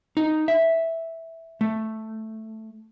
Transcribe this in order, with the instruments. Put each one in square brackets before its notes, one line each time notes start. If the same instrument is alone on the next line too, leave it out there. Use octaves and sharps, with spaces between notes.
[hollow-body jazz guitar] D#4
E5
A3